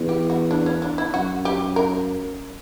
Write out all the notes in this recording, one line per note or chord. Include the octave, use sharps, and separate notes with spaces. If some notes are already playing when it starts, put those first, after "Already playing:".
Already playing: E2
G4
F#4
D4
C#4
D4
E4
F#2 F#4
G4
A#4